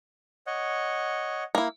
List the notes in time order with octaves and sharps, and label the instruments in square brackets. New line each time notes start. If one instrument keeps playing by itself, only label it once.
[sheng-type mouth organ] C#5 D#5 F#5
[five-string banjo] A#3 E4